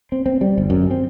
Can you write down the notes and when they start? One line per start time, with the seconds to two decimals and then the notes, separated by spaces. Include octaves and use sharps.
0.12 C4
0.26 C4
0.41 G3
0.58 G1
0.70 F#2
0.91 C4